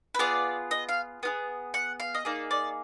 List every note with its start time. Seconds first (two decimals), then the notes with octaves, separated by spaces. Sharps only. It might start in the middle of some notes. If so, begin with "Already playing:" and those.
0.15 B4
0.19 B3 F4 G#4 D5
0.71 D#5
0.89 F5
1.23 B3 F4 G#4
1.74 F#5
2.00 F5
2.15 D#5
2.25 A#3 D#4 G#4 D5
2.51 D5